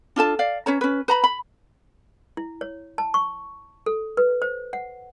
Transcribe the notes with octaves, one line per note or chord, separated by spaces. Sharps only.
D4 F4 A4 A5
D5 F5
C#4 B4 C#5 A#5
C#4 B4
B4 A#5 B5
B5
E4
C#5
A5
C#6
A4
B4
C5
F#5